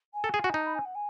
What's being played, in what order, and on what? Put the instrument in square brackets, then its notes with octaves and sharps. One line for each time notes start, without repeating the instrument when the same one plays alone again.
[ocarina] G#5
[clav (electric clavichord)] A4
G#4
F#4
[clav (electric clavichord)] D#4 [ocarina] A5
[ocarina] B5
G#5
F#5
G#5